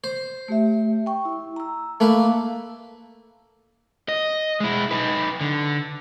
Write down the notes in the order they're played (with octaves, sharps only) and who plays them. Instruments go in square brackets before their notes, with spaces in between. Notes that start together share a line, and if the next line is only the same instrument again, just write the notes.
[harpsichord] C5
[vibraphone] A3 G4 E5
G5 C#6
E4
A#5 E6
[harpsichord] A3 A#3 B4
[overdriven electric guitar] D#5
G#3 E4
D#4 B4
D3